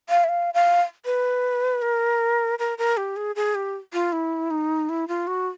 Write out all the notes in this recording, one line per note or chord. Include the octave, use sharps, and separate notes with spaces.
F5
E5
F5
F5
B4
A#4
A#4
A#4
G4
G#4
G#4
G4
F4
E4
D#4
E4
F4
F#4